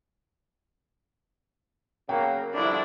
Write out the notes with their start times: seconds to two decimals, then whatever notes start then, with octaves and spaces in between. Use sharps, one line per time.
2.09 C#3 F#3 A#3 G5
2.54 C2 D3 F3 D4 E4